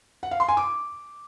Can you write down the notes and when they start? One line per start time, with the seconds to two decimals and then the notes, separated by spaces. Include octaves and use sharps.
0.23 F#5
0.31 F5
0.40 C6
0.48 G#5
0.57 D6